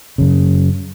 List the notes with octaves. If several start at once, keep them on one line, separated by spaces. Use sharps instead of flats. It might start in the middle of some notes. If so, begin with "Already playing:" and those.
F#2 C#3